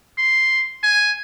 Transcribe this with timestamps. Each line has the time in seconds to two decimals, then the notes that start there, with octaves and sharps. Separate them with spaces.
0.18 C6
0.83 G#5